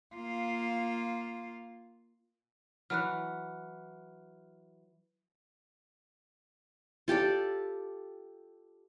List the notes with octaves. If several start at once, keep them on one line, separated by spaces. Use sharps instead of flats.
A#3 F4
E3 F#3 F6 F#6
F4 G4 A4 D5